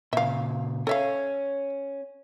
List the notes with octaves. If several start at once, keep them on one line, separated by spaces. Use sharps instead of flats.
A#2 C#3 E5 F5
C#4 A4 E5 F5